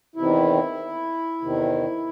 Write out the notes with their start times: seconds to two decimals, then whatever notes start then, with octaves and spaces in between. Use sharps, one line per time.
0.16 E2 C3 D#3 E4
1.41 E2 C3 D#3